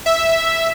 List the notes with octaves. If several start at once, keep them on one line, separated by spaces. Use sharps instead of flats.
E5